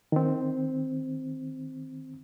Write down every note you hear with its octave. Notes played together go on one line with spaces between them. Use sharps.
D#3 C4